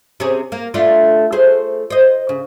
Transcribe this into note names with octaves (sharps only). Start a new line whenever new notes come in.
C3 C#4 G#4
A#3
A3 D4 F4
A3 G#4 C5
C5 D#5
C#3